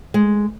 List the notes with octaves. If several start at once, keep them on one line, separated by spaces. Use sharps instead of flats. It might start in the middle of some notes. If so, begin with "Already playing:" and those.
G#3